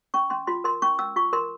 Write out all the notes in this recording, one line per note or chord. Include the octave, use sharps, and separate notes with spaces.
C#4 C#6
C#4 C6
F4 C6
A#4 C6
C#4 C#6
C#4 E6
F4 C#6
A#4 C6